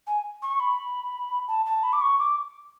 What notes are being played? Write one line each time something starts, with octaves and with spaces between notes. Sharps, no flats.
G#5
C#6
B5
A5
A5
B5
D6
C#6
D6